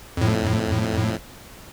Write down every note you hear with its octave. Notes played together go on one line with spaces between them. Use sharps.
F2 A2